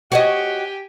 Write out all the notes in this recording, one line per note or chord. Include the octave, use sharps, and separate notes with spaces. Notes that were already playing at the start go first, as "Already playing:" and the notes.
F#4 G4 C#5 D#5 G#5